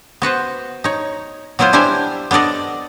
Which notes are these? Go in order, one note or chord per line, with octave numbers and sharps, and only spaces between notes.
B3 F#4 B4 C5
D#4 C#5
F#3 B3 E4 F4 C5
G3 D4 E4 G4 C5 G#5
B3 D4 A4 D5 D#5